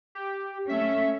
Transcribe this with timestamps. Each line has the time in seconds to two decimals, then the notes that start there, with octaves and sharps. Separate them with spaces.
0.15 G4
0.69 A3 C#4 E5